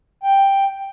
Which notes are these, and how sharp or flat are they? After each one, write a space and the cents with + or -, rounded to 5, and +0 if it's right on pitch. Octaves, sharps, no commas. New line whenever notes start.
G5 +5